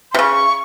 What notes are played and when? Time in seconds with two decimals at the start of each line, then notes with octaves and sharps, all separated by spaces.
0.12 C6
0.14 C3
0.19 C#3 C#6